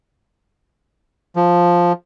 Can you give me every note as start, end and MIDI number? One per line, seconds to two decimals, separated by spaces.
1.36 1.92 53